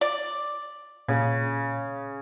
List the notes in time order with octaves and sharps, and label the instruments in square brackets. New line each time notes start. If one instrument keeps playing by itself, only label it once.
[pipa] D5
[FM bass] A#2 [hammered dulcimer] C#3